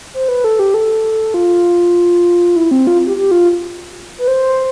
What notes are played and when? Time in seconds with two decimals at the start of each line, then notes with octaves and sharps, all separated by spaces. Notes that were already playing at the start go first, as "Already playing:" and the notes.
0.14 C5
0.28 B4
0.44 A4
0.59 G4
0.74 A4
1.34 F4
2.56 E4
2.71 C4
2.87 F4
3.06 G4
3.16 G4
3.31 F4
4.19 B4
4.28 C5